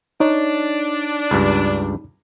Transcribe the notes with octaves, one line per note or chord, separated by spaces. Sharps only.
D4 D#4 C#5
C#2 G2